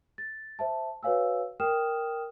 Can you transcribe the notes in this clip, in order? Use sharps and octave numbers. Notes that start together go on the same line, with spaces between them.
A6
C5 E5 A5
F#4 B4 C#5 F5 G#5 E6
A#4 G5 D#6 F6 E7